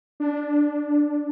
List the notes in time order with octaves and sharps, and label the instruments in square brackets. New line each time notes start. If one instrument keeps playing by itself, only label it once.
[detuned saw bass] D4